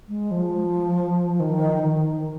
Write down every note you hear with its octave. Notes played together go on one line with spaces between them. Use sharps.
G#3
F3
D#3
D#3